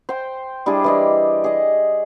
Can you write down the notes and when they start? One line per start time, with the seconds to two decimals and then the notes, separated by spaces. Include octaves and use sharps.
0.09 C5 G5
0.66 G3 D4 E4 G#4
0.84 E3 D5 D#5
1.44 G#4 D#5